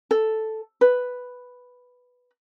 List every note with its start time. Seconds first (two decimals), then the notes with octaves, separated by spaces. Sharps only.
0.11 A4
0.81 B4